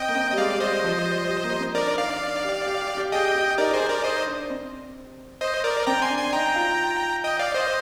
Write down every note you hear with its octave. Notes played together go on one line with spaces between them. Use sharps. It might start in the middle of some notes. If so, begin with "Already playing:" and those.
Already playing: C4 D#5 G5
A#3
C4
G3 D#5
G#3 D5 F5
G3 C5 D#5
F3
G3
G3
A#3
C4
D4 A#4 D5
D#4
D#4 D5 F5
D4
D4
G4
G4
G4
G4
G#4 D#5 G5
G4
D#4 A#4 D5
G#4 C5
D#4
A#4 D5
C5 D#5
D4
C4
C5 D#5
A#4 D5
C4 G5 A#5
G#5 C6
D4
G#5 C6
D#4 G5 A#5
F4
D#5 G5
D5 F5
C5 D#5